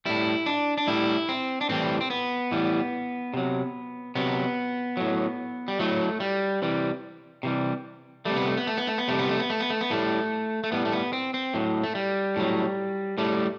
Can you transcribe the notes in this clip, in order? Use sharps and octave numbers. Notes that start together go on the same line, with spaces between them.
A2 G3 E4
D4
D4
A2 G3 E4
C4
D4
A2 E3 G3 C4
C4
B3
A2 E3 G3
C3 F#3
C3 F#3 B3
A2 F#3
G3
A2 F#3 A3
G3
C3 E3 G3
C3 E3 G3
C3 G3 A3
B3
A3
B3
A3
B3
A3
B3
C3 G3 A3
B3
A3
B3
A3
B3
A3
B3
A2 G3 A3
A3
A2 G3 B3
A3
B3
C4
C4
A2 F#3
A3
G3
A2 F#3
A2 G3 A3